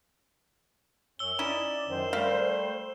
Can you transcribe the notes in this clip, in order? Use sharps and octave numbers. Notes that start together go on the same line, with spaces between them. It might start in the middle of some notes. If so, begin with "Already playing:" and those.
F#2 C#4 E6 G7
C#4 D#4 E4 D5 E7
F#2 D#3 C5
G3 A3 A#4 E5 F5